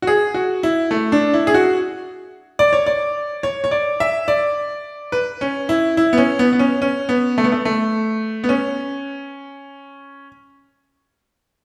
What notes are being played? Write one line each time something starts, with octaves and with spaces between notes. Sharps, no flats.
F#4
G#4
F#4
E4
A3
D4
E4
G#4
F#4
D5
C#5
D5
C#5
C#5
D5
E5
D5
B4
C#4
E4
E4
B3
C#4
B3
B3
C#4
C#4
B3
A3
B3
A3
A3
B3
C#4